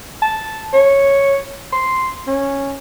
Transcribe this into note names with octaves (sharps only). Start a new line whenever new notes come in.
A5
C#5
C6
C#4